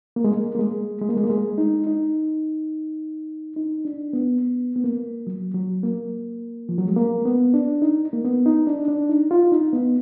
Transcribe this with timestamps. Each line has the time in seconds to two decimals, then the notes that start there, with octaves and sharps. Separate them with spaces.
0.16 A#3
0.24 G#3
0.32 A#3
0.55 A#3
0.59 G#3
1.01 G#3
1.09 A#3
1.17 G#3
1.24 A#3
1.30 G#3
1.58 D#4
1.87 D#4
3.56 D#4
3.85 D4
4.13 B3
4.41 B3
4.76 B3
4.84 A#3
5.27 F#3
5.54 F#3
5.83 A#3
6.69 F3
6.78 F#3
6.88 G#3
6.97 A#3
7.25 B3
7.54 D4
7.82 D#4
8.13 A#3
8.24 B3
8.46 D#4
8.67 D4
8.88 D4
9.09 D#4
9.31 F4
9.52 D#4
9.73 B3